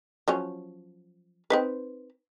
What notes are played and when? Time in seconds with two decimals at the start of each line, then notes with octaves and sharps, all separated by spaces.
0.28 F3 F#3 C#4
1.50 C4 D#4 B4